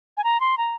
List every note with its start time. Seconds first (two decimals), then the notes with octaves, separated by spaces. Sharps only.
0.17 G#5
0.24 A#5
0.40 C6
0.58 A#5